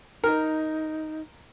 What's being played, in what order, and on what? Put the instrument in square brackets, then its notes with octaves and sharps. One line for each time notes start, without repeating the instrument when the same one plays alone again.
[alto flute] D#4 [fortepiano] A#4